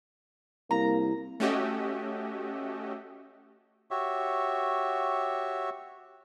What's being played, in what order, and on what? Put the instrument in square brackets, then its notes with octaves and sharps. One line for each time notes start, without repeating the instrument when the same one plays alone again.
[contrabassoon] C2 [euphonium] A#3 [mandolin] A#5
[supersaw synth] A3 C#4 F#4 G4 D#5 E5
[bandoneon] F#4 G4 C#5 E5